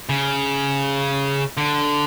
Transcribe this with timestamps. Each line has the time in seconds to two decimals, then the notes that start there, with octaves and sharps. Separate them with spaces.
0.09 C#3
1.57 D3